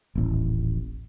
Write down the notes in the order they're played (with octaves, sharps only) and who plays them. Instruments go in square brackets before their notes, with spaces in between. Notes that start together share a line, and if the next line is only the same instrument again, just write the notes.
[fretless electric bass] D#1 A1